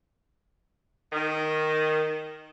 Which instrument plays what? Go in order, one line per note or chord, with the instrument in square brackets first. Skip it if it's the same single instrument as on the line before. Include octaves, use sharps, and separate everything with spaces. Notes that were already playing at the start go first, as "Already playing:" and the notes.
[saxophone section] D#3